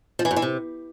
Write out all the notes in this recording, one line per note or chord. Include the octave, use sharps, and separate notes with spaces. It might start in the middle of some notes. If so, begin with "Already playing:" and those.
F3
E3
F#2
E3
C3